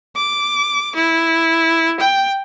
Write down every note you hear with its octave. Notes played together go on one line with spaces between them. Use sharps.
D6
E4
G5